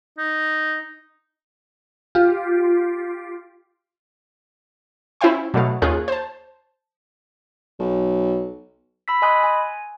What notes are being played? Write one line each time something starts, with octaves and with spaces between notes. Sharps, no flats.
D#4
F4 G4
C#4 E4 C5 E5 G5 C6
B2 F#3 A3 F5
D#2 C#4 F4 G#4 F#6
C5 A5
B1
B5 E6 B6
D#5 G#5 B5 C6 D#6 F#6
G#5